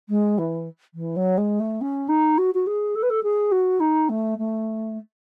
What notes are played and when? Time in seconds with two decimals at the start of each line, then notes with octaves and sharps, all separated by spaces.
0.09 G#3
0.38 E3
0.94 E3
1.16 F#3
1.37 G#3
1.59 A3
1.81 C#4
2.08 D#4
2.38 F#4
2.54 F#4
2.66 G#4
2.95 A4
3.02 B4
3.10 A4
3.23 G#4
3.51 F#4
3.80 D#4
4.09 A3
4.38 A3